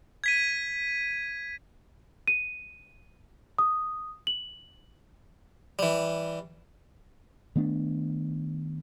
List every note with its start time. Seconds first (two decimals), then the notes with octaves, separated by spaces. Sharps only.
0.24 G#6 B6 D#7
2.28 D#7
3.59 D#6
4.27 F#7
5.79 E3 G3
7.56 D#3 A3 B3 D4